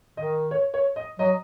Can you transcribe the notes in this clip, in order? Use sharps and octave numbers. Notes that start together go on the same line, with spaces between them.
D#3 D#5
C#5
C#5
D#5
F#3 D#5